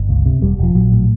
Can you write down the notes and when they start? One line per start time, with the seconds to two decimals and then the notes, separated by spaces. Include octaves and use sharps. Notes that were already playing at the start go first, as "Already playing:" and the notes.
Already playing: G1
0.09 C#2
0.26 C3
0.41 E1 G3
0.58 E1 F3
0.75 A#1 F#3
0.92 A2